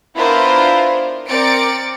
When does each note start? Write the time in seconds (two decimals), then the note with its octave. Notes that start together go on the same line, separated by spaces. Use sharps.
0.15 B3 D4 E4 F4 A#4 C5
1.28 C4 A#4 D5 A6 C#7 D7